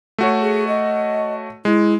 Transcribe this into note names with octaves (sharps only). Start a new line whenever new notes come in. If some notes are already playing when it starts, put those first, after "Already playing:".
A3 F#4 C#5
G#4
D#5
G#3 E4